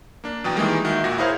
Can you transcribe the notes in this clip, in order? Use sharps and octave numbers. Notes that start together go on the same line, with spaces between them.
A#3 D4
E2 B2 F#3 G5
D#3 E3 G3 G#3 A#3
D#2 D#3 F#4 E5
D#2 A#2 F#4 A#6
E4 G#4 A#4 C5 C#5 F5